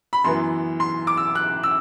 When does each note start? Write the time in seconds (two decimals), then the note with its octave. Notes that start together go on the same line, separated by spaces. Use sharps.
0.13 B5
0.24 F#2 E3 B3 C6
0.80 C6
1.07 D6
1.17 E6
1.35 F#6
1.63 E6